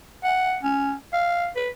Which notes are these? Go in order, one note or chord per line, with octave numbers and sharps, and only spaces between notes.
F#5
C#4
F5
B4